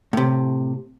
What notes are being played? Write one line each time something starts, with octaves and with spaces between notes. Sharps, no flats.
A2 C3